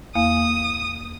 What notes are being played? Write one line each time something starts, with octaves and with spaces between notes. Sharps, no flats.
E2 A#3 F5 D#6